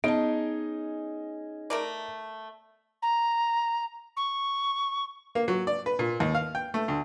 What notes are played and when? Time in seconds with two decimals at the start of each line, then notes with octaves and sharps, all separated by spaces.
0.04 B3 C#4 D#4 G#4 D#5 A5
1.70 A3 A#4 D5
3.02 A#5
4.16 C#6
5.35 A#3
5.48 F#3
5.67 D5
5.86 B4
5.99 A#2
6.20 D#2
6.35 F5
6.55 G5
6.74 A3
6.88 D2